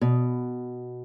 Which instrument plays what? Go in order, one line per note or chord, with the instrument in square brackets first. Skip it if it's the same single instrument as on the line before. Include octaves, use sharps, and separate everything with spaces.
[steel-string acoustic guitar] B2